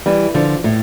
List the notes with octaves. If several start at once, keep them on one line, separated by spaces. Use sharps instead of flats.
E3 G3
D3 F3
A2